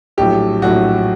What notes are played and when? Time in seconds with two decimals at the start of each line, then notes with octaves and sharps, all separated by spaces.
0.17 A#1 A2 F#3 G4
0.62 A#1 A2 F#3 F#4